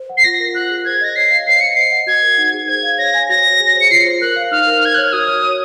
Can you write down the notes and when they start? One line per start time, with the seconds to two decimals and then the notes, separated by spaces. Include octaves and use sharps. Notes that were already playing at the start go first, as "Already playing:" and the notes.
Already playing: C5
0.09 F#5
0.17 C7
0.24 F4 A#6
0.40 A#4
0.54 F4 F#6
0.70 G#4
0.85 C5 G#6
1.01 D#5 A#6
1.16 C#5 C7
1.30 F5
1.46 C5 C7
1.61 D#5 C#7
1.74 C5 C7
1.92 F#5
2.07 F#4 G#6
2.22 A#4
2.38 D#4
2.53 G#4
2.68 C5 G#6
2.83 F5
2.98 C#5 A#6
3.14 G#5
3.29 F#4 A#6
3.45 C#5
3.60 G#4
3.75 C5
3.81 C#7
3.91 F4 C7
4.06 C5
4.21 A#4 F#6
4.36 F5
4.51 D#4 F6
4.67 A#4
4.82 A#4 G#6
4.95 C#5 F#6
5.03 F6
5.13 F#4 D#6
5.28 C#5
5.43 C#5